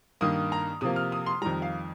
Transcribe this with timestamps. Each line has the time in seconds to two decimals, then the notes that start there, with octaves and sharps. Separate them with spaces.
0.21 G2 D#3 A#3 D#6
0.52 A#5
0.81 C3 F3 A#3 D#6
0.96 F6
1.12 D#6
1.26 C6
1.42 F2 D#3 G3 A#5
1.62 F5